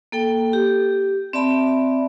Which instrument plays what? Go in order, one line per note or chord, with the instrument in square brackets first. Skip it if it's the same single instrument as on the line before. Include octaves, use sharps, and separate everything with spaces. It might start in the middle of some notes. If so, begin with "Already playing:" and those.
[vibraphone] A#3 A4 G5
G4
C4 D5 E5 A5 B5